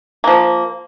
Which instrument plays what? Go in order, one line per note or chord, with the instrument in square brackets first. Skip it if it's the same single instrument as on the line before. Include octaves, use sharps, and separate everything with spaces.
[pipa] F3 A#3